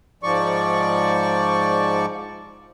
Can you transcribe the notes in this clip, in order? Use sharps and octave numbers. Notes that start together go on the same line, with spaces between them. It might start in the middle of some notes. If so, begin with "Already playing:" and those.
G#2 F3 D5 C#6